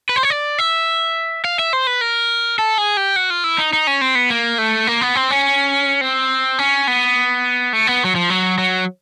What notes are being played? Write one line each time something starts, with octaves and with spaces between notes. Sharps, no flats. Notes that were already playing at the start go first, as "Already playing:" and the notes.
B4
C5
C#5
D5
E5
F5
E5
C5
B4
A#4
A4
G#4
G4
F#4
F4
E4
D#4
D#4
C#4
C4
B3
A#3
A3
A#3
B3
C4
C#4
C4
C#4
B3
A3
B3
F#3
F3
F#3
F#3